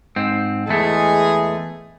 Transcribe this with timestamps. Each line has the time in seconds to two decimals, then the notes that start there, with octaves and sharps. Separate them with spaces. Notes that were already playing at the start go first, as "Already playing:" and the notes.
0.16 G#2 C4
0.68 E2 E3 G#3 A3 G#4